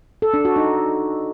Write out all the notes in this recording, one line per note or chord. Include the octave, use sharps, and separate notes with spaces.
A4
D4
F#4
D#4